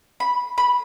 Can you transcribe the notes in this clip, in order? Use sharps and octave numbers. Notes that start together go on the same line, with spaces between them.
B5
B5